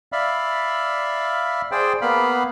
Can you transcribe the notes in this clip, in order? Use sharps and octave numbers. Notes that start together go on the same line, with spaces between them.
D5 E5 F5 B5
G#4 C5 D5 G5
A#3 B3 F5 B5